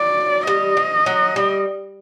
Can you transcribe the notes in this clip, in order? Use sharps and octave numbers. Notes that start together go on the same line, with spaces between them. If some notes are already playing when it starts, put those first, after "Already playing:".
Already playing: F#3 D5
G3 D#5
F3
F#3
G3